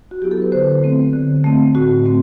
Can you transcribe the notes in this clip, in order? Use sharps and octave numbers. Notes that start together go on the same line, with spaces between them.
F#4
F#3 B3 E4 G4
A4
B4
D3 C5
A3 C4
D3
A3 C4
A2 F#4
A3 C4